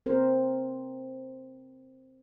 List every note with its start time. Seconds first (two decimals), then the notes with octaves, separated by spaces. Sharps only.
0.06 C4 A#4 C5